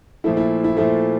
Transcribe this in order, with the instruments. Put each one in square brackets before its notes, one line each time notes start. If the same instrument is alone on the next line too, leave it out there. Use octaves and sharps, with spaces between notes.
[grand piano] A#2 F3 A3 E4
E4
E4
A#2 F3 A3 E4